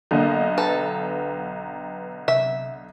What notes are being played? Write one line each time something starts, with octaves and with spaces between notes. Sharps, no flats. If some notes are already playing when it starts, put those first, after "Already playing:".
B1 D3 A#3 D4 A4 D#5
A4 B4 G5 A#5
C3 E5